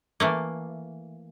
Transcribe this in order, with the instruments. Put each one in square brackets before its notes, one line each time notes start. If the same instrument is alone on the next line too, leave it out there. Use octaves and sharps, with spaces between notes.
[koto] E3 A3 A#3